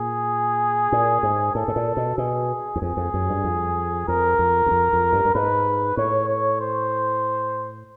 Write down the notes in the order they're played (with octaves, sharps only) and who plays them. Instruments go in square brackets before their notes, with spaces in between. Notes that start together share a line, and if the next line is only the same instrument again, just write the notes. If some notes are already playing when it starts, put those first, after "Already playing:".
Already playing: [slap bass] A#2 [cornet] G#4
[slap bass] A#2
G#2
[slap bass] A2 [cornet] A4
[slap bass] A2
A#2
B2
[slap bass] B2 [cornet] G#4
[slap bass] E2
[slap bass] F2 [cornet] G#4
[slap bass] F2
F#2
G2
F2
[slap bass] F2 [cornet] A#4
[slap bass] F2
E2
F2
F2
G2
G2
[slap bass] G#2 [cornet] B4
[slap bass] A2 [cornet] C#5
[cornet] C#5
C5